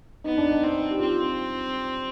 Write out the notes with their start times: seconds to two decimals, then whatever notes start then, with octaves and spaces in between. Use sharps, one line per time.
0.24 B3 D#4
0.38 D4
0.50 D#4
0.63 C4
0.91 G4
0.99 C4 F4